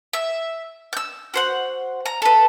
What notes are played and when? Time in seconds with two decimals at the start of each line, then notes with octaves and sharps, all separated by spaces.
0.13 E5
0.93 E6 G6
1.34 F#4 C5 F#5
2.06 A#5
2.22 A4 B4